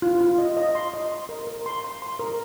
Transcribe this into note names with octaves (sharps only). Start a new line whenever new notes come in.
F4
F4
D#5
D#5
C6
D#5
C6
A#4
A#4
C6
C6
C6
A#4